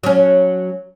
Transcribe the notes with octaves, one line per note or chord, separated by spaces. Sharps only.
F#3 C#4